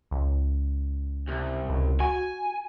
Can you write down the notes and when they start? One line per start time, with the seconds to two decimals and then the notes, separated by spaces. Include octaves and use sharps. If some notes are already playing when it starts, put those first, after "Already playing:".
0.11 C#2
1.28 C2
1.70 C#2
2.00 F#4 G#5